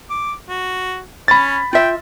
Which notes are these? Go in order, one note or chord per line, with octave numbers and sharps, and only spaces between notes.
D6
F#4
C#4 B5 A6
F4 E5 G5